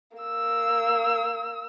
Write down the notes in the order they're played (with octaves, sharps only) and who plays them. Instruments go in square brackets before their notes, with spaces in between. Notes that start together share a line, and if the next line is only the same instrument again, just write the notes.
[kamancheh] A#3 E6